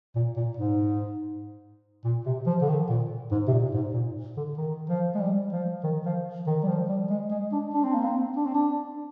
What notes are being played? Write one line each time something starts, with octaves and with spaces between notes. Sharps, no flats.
A#2
A#2
G#2
A#2
C3
F3
D3
D#3
A#2
G#2
C3
A#2
G#2
A#2
D3
D#3
F3
G#3
G3
F3
D#3
F3
D#3
G3
F3
G3
G#3
G#3
D4
D4
C4
A#3
C4
D4
C4
D4